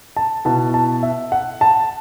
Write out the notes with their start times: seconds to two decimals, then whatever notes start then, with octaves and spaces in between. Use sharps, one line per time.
0.17 A5
0.45 B2 B3 E4 A5
0.74 A5
1.03 E5
1.32 F#5
1.61 A5